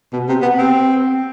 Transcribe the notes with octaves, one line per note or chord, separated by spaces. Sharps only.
B2
C3
B3
C4